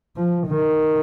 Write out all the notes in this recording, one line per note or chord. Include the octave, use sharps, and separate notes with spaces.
F3
D#3